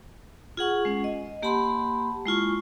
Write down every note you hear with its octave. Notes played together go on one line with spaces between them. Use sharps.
F4 G#4 F#5 C#6
G#3 C#4
D#5
A#3 G4 F#5 A5 B5 C6
G#3 E4 F4 C#6